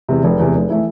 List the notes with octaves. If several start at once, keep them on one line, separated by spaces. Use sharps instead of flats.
E2 C3
F1
E2 C3
F1
E3 A3 E4